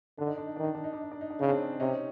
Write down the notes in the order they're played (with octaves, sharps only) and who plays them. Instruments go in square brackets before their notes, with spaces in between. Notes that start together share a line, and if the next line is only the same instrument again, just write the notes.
[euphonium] D3 [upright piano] D4
[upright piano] D#4
D4
D#4
[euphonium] D#3 [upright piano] D4
[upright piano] D#4
D4
D#4
D4
D#4
D4
D#4
D4
[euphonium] C#3 [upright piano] D#4
[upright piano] C4 D4
[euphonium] C3 [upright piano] C#4 D#4